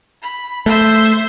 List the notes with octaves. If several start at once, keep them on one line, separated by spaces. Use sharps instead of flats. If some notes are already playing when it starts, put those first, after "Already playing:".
B5
A3 C5 E5